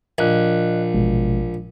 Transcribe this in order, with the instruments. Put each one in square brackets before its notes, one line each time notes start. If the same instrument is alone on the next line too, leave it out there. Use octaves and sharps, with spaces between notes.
[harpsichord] A#1 [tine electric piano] D#5 F#6
[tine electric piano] A1 B2 G#3